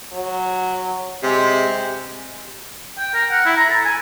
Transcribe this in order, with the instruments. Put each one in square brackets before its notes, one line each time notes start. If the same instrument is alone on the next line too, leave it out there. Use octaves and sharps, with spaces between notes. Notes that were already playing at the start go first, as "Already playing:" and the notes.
[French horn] F#3
[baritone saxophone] C3 [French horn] G#3
[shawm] G5
A#4
F#5
E4
A#5
A4
G#5